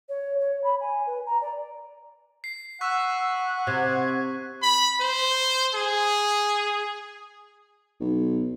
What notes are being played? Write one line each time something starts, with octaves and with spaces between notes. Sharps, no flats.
C#5
C#5
B5
G#5
B4
A#5
D5
C7
F#5 C#6 E6 F#6 B6
C3 G#6
B5
C5
G#4
B1